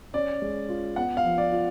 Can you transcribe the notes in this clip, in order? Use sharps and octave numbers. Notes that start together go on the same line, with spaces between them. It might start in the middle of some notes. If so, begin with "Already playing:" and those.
C#4 D5
G#3
F4
B3 F#5
F5
F3
D5
F4